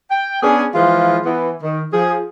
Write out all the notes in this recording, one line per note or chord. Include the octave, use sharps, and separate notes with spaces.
G5
B3 C#4 D4 G#4
E3 F3 G#3 E4 F4
E3 B3
D#3
F3 G#4